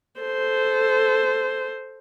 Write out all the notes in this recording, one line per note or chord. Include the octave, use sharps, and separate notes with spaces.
A4 C5